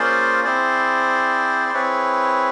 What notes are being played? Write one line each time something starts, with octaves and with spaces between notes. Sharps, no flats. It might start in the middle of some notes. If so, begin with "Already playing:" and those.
Already playing: A#3 C#4 F4 G#4 C5 D5
C4 E4 G#4 C5 D5
C5
C4 E4 G#4 B4 C#5